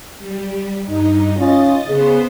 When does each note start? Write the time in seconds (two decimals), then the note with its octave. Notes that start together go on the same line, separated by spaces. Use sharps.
0.19 G3
0.85 G2 D#4
1.37 C#4 F4 D#5 A6
1.87 C#3 B3 C5